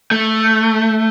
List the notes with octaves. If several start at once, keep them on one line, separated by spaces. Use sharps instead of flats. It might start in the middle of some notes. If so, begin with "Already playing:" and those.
A3